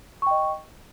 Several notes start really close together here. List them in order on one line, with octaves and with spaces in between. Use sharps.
C#6 G5 D#5